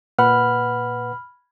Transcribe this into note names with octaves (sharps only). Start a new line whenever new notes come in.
A#2 B4 F#5 B5 F6